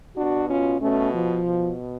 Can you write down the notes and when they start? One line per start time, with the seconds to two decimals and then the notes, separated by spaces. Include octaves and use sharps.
0.16 B2 D4 F#4
0.48 C#4 F4
0.80 B2 A3 C#4
1.13 F3
1.44 B2